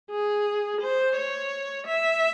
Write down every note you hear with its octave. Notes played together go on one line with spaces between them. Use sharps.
G#4
C5
C#5
E5